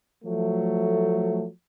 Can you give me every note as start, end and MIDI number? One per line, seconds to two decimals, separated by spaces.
0.24 1.46 53
0.24 1.46 54
0.24 1.46 57